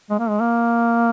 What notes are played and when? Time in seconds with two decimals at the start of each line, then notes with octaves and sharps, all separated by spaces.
0.10 G#3
0.19 A#3
0.29 G#3
0.40 A#3